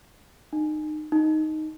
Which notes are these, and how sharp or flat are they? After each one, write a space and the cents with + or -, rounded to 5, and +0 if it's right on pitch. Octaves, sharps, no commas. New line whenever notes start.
D#4 -30
D#4 +0